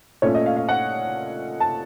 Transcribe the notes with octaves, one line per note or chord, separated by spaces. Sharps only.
A#2 A3 C#4 F4 C#5
D#5
F5
F5
F#5
A5